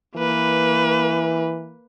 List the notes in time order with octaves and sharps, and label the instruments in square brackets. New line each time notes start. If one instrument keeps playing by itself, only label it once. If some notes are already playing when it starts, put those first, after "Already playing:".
[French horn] E3 [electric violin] A#3 B4